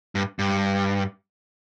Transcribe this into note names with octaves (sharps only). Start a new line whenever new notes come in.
G2
G2